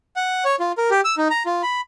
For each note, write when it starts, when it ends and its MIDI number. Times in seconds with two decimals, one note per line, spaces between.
0.16 0.44 78
0.45 0.56 73
0.60 0.72 65
0.78 0.90 70
0.90 1.01 67
1.05 1.15 88
1.17 1.28 63
1.30 1.43 82
1.46 1.62 65
1.63 1.81 83